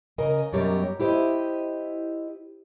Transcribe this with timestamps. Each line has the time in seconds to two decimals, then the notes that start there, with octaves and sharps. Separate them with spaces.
0.18 C#3 A#4 D#5 G#5
0.53 F#2 B2 G3 G4 A#4 C#5
1.00 E4 G4 C5 D#5